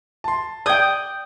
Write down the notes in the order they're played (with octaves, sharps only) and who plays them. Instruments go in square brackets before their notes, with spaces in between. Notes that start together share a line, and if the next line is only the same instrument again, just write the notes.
[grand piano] A5 C6
[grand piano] D5 G6 G#6 [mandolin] G5 D#6